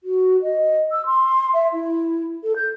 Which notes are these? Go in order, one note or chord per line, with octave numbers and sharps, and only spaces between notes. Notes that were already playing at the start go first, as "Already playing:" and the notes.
F#4
D#5
E6
C6
E5
E4
A4
G6